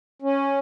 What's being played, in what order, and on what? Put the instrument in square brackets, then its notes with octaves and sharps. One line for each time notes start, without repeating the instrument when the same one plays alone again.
[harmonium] C#4